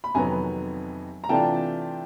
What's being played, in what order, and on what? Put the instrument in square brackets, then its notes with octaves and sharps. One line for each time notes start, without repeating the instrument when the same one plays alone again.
[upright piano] B5
F2 C3 D#3 F#3 B3 G#5 A#5
A#5
C3 E3 A3 D4 F4 G5 A5